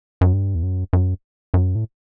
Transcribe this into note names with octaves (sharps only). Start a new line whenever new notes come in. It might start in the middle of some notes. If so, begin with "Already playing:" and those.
F#2
G2
E2
F#2
F#2
F#2
A2